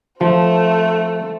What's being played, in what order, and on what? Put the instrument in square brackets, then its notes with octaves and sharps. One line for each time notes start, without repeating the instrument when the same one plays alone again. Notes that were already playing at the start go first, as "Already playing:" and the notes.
[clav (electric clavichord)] F3 [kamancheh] A3 C4